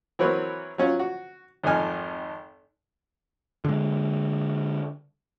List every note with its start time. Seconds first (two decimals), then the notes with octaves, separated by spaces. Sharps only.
0.19 E3 F#3 C4 A#4 B4 C#5
0.78 F#3 C#4 F4
0.99 F#4
1.63 G#1 F2 D#4 G#5 F6
3.65 D3 G#3